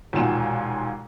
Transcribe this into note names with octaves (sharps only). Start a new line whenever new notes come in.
E1 D#2 A#2 F4 F#4 E7